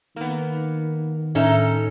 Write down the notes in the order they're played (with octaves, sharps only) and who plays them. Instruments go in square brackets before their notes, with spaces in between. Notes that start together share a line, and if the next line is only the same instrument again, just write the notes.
[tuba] D#3 [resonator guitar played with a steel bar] A#3 B3
[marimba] A2 E5 A#5 [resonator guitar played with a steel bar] C#4 D#4 A4